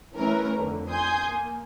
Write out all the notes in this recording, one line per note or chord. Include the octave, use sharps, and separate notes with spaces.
E3 A3 C#4 A#4 B4
F2 D3
G#5 C6 D#6 G6
A#3